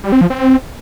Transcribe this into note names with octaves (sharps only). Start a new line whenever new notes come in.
G3
C4
F3
C4